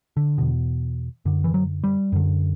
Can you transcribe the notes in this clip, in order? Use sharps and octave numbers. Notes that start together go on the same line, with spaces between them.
D3
E2 B2
F#2 D3
E3
F#3
G3
F#2 D3